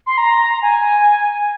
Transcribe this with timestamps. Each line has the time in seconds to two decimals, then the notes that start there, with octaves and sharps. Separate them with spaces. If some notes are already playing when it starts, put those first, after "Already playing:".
0.07 C6
0.18 A#5
0.62 G#5